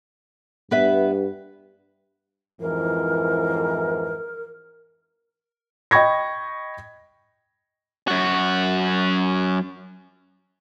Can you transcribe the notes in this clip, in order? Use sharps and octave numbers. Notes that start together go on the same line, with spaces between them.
G2 B3 B4 E5
F2 G#2 E3 A#4
D#5 G5 B5 C#6 G#6 A#6
F#2 F#4